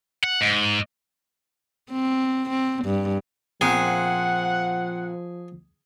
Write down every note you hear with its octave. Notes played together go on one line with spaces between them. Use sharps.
F#5
G#2
C4
C4
G2
A#2 F3 C4 G#4 F#5